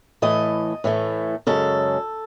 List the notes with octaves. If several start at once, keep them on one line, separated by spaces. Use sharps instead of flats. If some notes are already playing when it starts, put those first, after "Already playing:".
A2 E3 A3 D#5
A2 E3 A3
F#2 C#3 G#3 A4